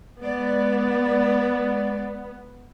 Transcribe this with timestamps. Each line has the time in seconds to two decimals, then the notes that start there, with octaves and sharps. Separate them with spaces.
0.21 G#3 B3 D5